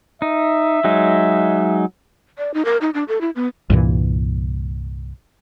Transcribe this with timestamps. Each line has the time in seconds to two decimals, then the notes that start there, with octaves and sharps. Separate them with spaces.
0.22 D#4 E5
0.84 F#3 G#3 D#4
2.38 D5
2.54 D#4
2.65 A#4
2.81 D#4
2.94 D4
3.08 A4
3.21 E4
3.36 B3
3.70 C2 G2 A#2 E3